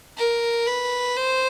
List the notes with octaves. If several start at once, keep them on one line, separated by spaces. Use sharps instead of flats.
A#4
B4
C5